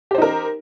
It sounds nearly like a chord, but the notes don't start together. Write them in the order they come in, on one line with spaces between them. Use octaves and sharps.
G4 C5 D#4 A#4